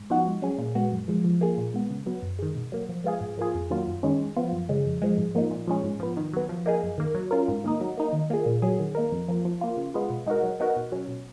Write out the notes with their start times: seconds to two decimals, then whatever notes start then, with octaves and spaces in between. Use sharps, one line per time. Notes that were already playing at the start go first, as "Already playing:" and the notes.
Already playing: G#2
0.10 F3 B3 D#4 F#4
0.27 G#2
0.42 F#3 C#4 G#4
0.58 A#2
0.75 G#3 B3 F#4
0.91 F#2
1.08 F3 G#3
1.24 F3
1.41 A#3 F4 G#4
1.58 A#2
1.74 G#3 B3
1.90 C#3
2.06 F#3 B3
2.22 F#2
2.39 D#3 G#3
2.55 B2
2.72 F#3 A#3
2.89 F3
3.04 G#3 B3 F4 G#4
3.21 G#2
3.37 F3 A#3 F4 G#4
3.54 F2
3.70 D#3 F#3 A#3 F4
3.87 F#2
4.03 D#3 G#3 C#4
4.20 G#2
4.36 F3 B3 F4
4.53 F#2
4.69 C#3 G#3
4.86 F2
5.02 F3 G#3
5.18 G#2
5.35 F3 A#3 D#4
5.51 A#2
5.68 F3 G#3 C#4
5.84 G#2
6.00 F3 B3
6.17 D#3
6.33 F#3 B3
6.49 F3
6.66 A#3 D#4 G#4
6.83 F#2
6.98 D#3 A#3
7.15 F#3
7.31 C#4 F4 A#4
7.48 G#2
7.64 D#3 A#3 D#4
7.81 F#3
7.97 A#3 D#4
8.13 D#3
8.30 A#3 F4 G#4
8.46 A#2
8.62 F#3 C#4 G#4
8.79 D#3
8.95 A#3 D#4 A#4
9.12 F2
9.28 F3 A#3
9.45 F3
9.61 A#3 F4
9.77 C#3
9.94 G#3 B3 F4
10.10 B2
10.26 G#3 D#4 F#4 A#4
10.43 F#3
10.60 B3 D#4 F#4 A#4
10.76 B2
10.92 F#3 C#4
11.08 B2